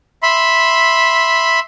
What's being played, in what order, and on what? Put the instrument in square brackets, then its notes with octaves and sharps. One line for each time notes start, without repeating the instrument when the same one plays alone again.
[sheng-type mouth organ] E5 B5 C6